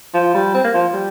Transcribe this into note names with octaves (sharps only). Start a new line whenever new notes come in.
F3
G3
C4
A#3
F3
G3